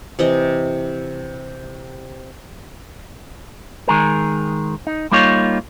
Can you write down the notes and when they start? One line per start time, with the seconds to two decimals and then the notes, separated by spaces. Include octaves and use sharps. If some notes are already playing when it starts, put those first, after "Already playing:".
0.19 C3 E3 D#5
3.88 D#3 G#3 G#4 A#4
4.87 D#4
5.11 G3 A#3 D#4 F4 C#5